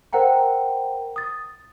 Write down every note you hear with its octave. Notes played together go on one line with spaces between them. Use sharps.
A#4 C5 F#5 G5 A#5
D#6 A6